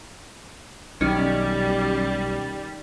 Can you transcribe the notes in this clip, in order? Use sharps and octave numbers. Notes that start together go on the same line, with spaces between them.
B1 D#3 G3 C#4